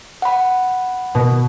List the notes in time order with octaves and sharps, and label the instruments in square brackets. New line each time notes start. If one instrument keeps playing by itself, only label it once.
[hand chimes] F#5 B5
[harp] B2